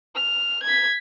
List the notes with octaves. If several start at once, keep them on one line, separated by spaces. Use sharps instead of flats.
F6
G#6 B6